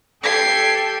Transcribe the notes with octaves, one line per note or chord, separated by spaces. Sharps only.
G4 A4 G#6 C7